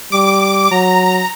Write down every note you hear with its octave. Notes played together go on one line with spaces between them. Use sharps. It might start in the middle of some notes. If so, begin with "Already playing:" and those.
G3 D6
F#3 A#5